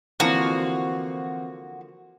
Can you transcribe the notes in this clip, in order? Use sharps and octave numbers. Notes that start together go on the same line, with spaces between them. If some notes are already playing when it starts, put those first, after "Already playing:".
D3 E3 F3 A#3 C4 F#4